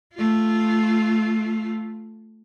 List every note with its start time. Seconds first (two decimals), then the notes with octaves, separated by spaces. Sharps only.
0.14 A3 F4